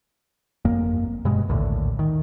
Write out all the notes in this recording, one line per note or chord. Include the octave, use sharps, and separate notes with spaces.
G1 F2 A#3
G2 B2 G#3
A#1 D#2 A2 D3
D#3